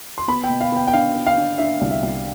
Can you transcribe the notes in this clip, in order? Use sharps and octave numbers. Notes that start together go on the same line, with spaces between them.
C6
B3 B5
G5
B2
F5
B3 G5
G5
D4 F5
B3
F5
D4
D4 E5
C2
E5
C2